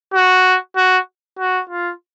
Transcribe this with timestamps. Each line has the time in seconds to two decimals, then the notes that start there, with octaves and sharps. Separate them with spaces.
0.14 F#4
0.76 F#4
1.39 F#4
1.70 F4